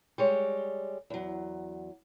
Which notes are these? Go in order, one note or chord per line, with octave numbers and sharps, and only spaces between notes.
G3 G#3 C#5
E2 F#3